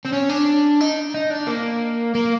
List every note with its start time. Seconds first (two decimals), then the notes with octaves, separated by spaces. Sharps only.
0.05 C4
0.12 C#4
0.29 D4
0.81 D#4
1.14 D#4
1.30 D4
1.47 A#3
2.15 A#3